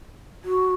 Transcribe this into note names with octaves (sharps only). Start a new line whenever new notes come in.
F#4